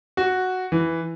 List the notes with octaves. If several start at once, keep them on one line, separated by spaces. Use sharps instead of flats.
F#4
E3